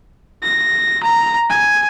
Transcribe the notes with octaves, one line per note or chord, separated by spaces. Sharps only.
A#6
A#5
G#5